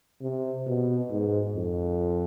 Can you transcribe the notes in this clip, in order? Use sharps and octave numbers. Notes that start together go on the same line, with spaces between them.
C3
B2
G#2
F2